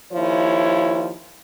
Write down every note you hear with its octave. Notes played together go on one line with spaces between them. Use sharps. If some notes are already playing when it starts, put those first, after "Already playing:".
D#2 F3 E4 C#5